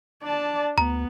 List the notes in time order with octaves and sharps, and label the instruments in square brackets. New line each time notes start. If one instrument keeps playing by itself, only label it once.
[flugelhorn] D4 [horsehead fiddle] D5 A5
[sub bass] D2 [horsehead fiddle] B3 [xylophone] A#5